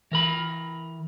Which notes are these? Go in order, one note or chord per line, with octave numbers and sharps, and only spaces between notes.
E3 A#4 B5